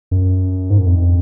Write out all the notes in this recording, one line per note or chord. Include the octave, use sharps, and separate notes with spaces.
F#2
G#2
F#2
F2